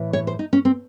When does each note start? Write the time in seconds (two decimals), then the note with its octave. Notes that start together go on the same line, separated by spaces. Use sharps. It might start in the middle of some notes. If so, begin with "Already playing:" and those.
Already playing: A2 E3
0.13 C#5
0.27 C5
0.39 D#4
0.53 C#4
0.65 C4